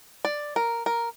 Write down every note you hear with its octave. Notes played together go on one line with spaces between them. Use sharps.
D5
A#4
A#4